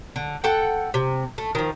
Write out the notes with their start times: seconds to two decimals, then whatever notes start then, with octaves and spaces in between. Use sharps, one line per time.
0.16 D3
0.44 A4 F#5 G5
0.94 C3
1.38 A3
1.55 D#3 F3